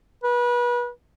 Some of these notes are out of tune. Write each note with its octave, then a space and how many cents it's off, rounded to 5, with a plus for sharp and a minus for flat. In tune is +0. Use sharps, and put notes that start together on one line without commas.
B4 -30